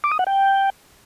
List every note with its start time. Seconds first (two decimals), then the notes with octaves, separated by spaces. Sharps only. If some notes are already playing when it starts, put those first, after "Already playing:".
0.04 D6
0.11 D#6
0.19 F#5
0.27 G5